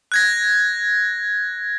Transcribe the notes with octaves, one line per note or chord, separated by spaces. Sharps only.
F#6 G#6 A#6